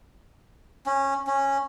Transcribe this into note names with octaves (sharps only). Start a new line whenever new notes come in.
C#4
C#4